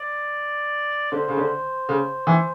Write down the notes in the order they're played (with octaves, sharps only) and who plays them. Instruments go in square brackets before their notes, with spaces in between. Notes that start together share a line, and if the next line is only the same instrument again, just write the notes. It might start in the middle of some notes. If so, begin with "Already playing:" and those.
Already playing: [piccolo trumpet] D5
[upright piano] D3 [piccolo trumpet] C5
[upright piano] C#3
D3
C#3
E3